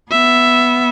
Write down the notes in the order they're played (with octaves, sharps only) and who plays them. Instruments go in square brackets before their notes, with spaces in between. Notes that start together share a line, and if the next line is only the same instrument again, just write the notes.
[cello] B3 [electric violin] E5